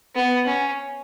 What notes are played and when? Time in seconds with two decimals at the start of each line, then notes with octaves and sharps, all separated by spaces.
0.15 B3
0.47 C#4